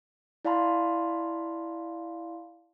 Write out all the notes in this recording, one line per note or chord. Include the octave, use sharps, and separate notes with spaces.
E4 D5 F5 A5 B5 C6